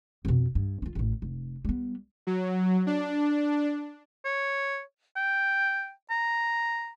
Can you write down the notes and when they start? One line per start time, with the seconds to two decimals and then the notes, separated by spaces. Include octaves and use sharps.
0.25 F2 B2
0.55 G2
0.82 C#4 F4
0.95 A1 A2
1.22 F1
1.65 G3 B3
2.27 F#3
2.87 D4
4.25 C#5
5.17 G5
6.10 A#5